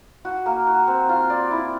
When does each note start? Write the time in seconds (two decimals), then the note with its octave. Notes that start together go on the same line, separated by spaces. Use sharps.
0.25 F#4
0.46 A#3
0.67 F#4
0.87 C4
1.09 F4
1.30 D5
1.51 E4